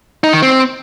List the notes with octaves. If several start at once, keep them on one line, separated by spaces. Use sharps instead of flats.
D#4
D#3
C4